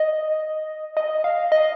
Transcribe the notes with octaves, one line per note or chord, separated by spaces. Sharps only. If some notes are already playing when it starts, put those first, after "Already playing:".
Already playing: D#5
D#5
F5
D#5